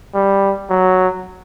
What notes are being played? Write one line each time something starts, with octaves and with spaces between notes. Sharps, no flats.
G3
F#3